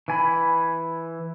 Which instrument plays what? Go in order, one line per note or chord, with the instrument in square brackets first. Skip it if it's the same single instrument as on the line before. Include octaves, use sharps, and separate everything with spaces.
[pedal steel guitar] E3 G#5 B5